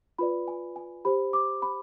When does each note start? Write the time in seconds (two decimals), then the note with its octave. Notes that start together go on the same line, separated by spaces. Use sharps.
0.19 F4 B4 D5 B5
0.48 G#5
0.76 G#5
1.05 G4 C5 B5
1.33 D6
1.62 B5